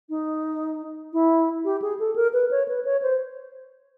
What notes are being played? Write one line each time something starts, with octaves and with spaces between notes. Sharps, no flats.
D#4
E4
G4
G#4
A4
A#4
B4
C#5
B4
C#5
C5